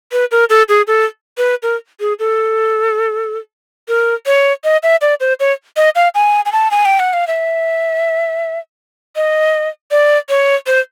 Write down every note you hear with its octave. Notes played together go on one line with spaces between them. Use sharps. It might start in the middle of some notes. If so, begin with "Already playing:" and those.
B4
A#4
A4
G#4
A4
B4
A#4
G#4
A4
A#4
C#5
D#5
E5
D5
C5
C#5
D#5
F5
G#5
G#5
A5
G#5
G5
F#5
F5
E5
D#5
D5
C#5
C5